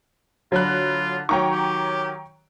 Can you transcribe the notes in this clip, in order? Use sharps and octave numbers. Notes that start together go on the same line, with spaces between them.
D3 F#3 F4 B5 F#6
D#3 F#3 G4 C#5 G5 A#5 C#6
G4